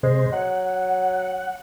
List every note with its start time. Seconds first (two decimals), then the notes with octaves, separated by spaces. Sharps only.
0.03 C3 G#3 C5
0.32 F#3 F#5